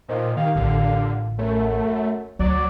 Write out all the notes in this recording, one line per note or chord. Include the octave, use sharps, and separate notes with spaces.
A#2 D#3 F3
D#3 A#3 G4 F5
A1 D3 F4
F#2 A3
D2 F#3 D5